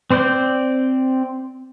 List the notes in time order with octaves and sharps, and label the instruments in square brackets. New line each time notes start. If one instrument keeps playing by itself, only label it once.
[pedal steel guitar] C4 C5 D5 G6